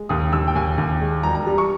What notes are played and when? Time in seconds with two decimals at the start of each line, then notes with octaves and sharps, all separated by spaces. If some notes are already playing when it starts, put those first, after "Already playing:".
Already playing: G#3
0.09 D#2 D#6
0.33 D#2 E6
0.48 G5
0.55 D#2 G#5
0.78 D#2
1.01 G#3
1.23 E1 A#5
1.35 A#5
1.47 G3
1.58 C#6